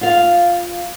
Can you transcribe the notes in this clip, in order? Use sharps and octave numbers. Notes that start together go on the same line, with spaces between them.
F4 F5